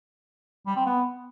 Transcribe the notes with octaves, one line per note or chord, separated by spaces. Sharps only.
G3
C4
B3